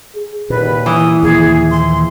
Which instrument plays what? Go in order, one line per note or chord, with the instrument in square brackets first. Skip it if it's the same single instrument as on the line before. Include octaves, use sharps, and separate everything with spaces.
[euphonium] G#4
[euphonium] D#2 [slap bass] A#2 [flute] B4
[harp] E3 [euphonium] E4 [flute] D#6
[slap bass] D#2 A#2 F3 [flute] G#4
[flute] C6